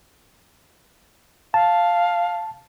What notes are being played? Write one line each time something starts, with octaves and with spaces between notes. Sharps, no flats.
F5 A5